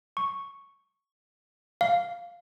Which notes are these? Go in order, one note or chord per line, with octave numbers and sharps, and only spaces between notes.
C#6
F5